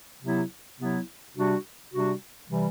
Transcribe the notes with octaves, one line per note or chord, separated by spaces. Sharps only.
C3 F#3 B3 E4
C3 F#3 B3 E4
C3 G3 D4 F#4
C3 G3 D4 F#4
C3 E3 G3